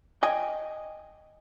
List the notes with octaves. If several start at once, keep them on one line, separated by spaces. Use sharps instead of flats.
D#5 G5 G#5